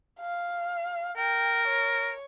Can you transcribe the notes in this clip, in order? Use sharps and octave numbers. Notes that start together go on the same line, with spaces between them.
F5
A#4 G5
C#5